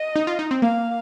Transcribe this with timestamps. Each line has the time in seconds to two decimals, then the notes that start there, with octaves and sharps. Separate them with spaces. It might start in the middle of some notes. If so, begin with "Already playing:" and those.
Already playing: D#5
0.16 D#4
0.27 F4
0.39 D#4
0.51 C4
0.62 A#3 F5